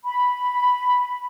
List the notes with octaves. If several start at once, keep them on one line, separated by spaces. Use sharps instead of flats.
B5